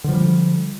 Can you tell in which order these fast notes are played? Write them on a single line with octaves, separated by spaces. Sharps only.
D3 F3 G3